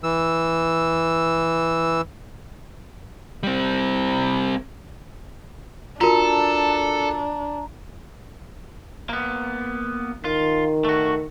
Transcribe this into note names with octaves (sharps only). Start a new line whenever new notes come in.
E3 E6
G3 C4
D4 F4 F#4 A4 A#4 A#5
A#3 B3
D#3 F4
A3 F#4